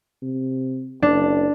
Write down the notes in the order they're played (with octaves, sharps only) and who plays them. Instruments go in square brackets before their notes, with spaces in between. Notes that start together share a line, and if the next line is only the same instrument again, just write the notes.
[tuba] C3
[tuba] F#1 [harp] D4